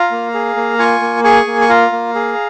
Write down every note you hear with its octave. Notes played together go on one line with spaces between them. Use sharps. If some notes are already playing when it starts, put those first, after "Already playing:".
Already playing: F4 F5 A#5
A#3
G#4
A#3
F4 G#5 C#6
A#3
G#4 G#5 C#6
A#3
C#6
F4 F5 A#5
A#3
G#4